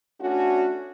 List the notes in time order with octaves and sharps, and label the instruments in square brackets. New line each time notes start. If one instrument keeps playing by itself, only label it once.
[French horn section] A3 C#4 D4 F#4